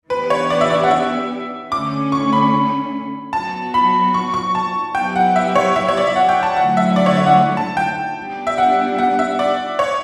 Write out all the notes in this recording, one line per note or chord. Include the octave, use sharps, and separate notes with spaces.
E3 B3 D4 G4 B4
C#5
D5
E5
D5
F#5
E5
D3 A3 C#4 D6
C#6
B5
F#3 B3 F#4 A5
B5
C#6
C#6
A5
F#3 B3 E4 G4 G5
F#5
E5
C#5
E5
C#5
D5
E5
F#5
G5
A5
D3 F#3 A3 E4 F#5
E5
D5
C#5
E5
F#5
A5
G5
G3 B3 D4 G4
E5
F#5
F#5
E5
D5
C#5